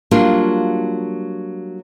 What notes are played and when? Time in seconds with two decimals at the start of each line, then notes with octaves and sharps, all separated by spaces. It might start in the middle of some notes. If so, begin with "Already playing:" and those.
0.11 F#3 G3 A#3 D4 F4